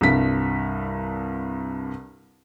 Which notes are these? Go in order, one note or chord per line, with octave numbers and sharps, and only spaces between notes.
C2 G2 B6